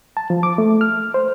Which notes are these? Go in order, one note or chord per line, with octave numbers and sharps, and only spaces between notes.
A5
F3
D6
A3
F6
C5